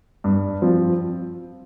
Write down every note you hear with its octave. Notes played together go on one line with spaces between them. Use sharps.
G2
F3 C4